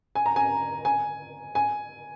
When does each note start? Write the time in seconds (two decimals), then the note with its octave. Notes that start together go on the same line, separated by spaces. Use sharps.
0.15 G#5
0.26 A#5
0.36 G#5
0.85 G#5
1.55 G#5